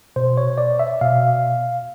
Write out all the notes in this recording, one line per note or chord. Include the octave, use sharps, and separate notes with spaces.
B2 C5
C#5
D5
E5
B2 F5